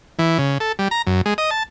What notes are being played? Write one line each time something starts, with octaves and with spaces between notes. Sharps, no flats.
E3
C#3
A4
G3
A#5
F#2
G#3
D#5
A5